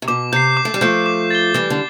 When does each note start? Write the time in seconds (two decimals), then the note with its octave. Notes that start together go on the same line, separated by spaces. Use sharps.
0.02 C3
0.08 B2 D6
0.33 C3 G6 C7
0.57 D6
0.65 A3
0.74 G3
0.81 F3 A3 G6 C7
1.06 D6
1.30 A6 C7 G7
1.54 E3 G3 D6
1.70 D3